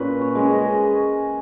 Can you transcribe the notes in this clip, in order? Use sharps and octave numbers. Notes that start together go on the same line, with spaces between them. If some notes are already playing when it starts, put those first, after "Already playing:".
Already playing: A#2 C#4 B4
C#5
G#3 C#4
D#5